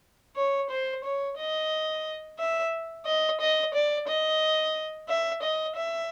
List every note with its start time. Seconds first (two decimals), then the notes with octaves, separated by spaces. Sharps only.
0.36 C#5
0.70 C5
1.04 C#5
1.38 D#5
2.39 E5
3.06 D#5
3.40 D#5
3.74 D5
4.08 D#5
5.09 E5
5.43 D#5
5.76 E5